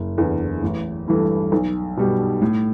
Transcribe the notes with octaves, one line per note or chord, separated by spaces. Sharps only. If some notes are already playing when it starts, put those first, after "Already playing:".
Already playing: F#1
E2 D3
A1
G2 E3 A3 E4
B1
B2 G3
A2